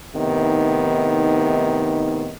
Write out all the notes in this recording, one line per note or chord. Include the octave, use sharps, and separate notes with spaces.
A2 C3 D#3 B3 D#4